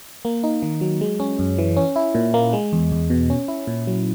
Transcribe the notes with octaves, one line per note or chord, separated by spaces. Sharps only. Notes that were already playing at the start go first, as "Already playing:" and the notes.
A#3
D#4
D#3
F#3
G#3
C#4
F#2
E3
C#4
E4
A#2
A#3
G#3
E2
E2
B2
C#4
E4
A#2
F#3